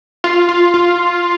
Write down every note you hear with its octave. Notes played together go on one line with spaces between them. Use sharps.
F4
F4
F4